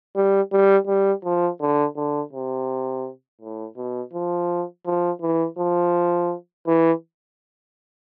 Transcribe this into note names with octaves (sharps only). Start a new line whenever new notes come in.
G3
G3
G3
F3
D3
D3
C3
A2
B2
F3
F3
E3
F3
E3